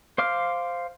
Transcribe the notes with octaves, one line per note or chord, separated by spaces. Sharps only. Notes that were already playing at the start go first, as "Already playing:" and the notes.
C5 F5 D6 F6